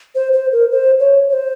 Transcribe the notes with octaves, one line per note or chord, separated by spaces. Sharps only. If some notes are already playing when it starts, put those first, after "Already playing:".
C5
C5
A#4
C5
C#5
C#5
C5